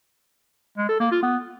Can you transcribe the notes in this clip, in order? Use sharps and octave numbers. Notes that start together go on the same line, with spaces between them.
G#3
A4
A#3
F4
B3